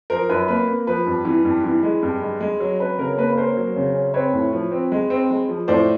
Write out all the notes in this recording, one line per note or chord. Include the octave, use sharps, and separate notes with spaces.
F3 A#4 C5
F#2 B4
A#3 B4
A#3
F3 B4
G2
E3
G2
E3
G#3
G2
G#3
G#3
F#3
C#4 B4
C#3 A#4
A#3 B4
B4
C#4 A#4 C5
F#3
C#3
C#4
C4 B4 C#5
A2
F3
C4
G#3
C4
G#3
F3
A2 C5 D5